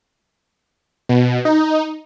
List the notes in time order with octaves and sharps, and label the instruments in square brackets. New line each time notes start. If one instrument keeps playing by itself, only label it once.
[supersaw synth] B2
D#4